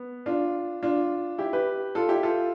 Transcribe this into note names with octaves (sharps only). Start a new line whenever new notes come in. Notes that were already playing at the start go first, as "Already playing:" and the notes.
Already playing: B3
D4 F4
D4 F4
E4 G4
G4 B4
F4 A4
E4 G4
F4 A4